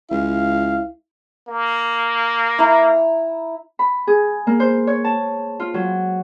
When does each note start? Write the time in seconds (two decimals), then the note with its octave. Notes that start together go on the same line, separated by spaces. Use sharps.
0.11 C#2 E4 F5
1.48 A#3
2.59 E4 A#5
3.79 B5
4.07 G#4
4.47 A#3
4.60 C5
4.87 C#5
5.04 A5
5.60 F4
5.74 F#3